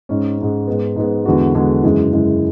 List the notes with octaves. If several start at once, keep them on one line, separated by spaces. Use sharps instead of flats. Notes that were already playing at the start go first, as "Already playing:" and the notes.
G#2 G#3 C#4
G#2 G#3 C#4
G#2 G#3 B3
G#2 G#3 B3
E2 D3 G#3 B3 F#4
E2 D3 G#3 B3 F#4
F#2 C#3 E3 G#3
F#2 C#3 E3 G#3